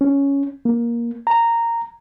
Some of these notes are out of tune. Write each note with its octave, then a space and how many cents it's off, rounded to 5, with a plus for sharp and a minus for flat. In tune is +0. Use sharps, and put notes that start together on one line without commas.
C#4 +5
A#3 +15
A#5 -10